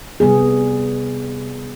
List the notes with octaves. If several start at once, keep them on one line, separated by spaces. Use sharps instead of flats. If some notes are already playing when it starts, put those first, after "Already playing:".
C3 G3 B3 G#4